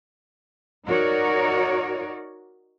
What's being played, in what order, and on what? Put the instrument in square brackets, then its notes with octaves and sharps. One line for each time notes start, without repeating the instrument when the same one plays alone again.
[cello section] D#4 F#4 A#4 C#5 D5